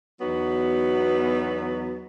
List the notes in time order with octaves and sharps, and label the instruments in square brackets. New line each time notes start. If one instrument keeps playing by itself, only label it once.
[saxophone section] E2 F#3 B3 D#4 F#4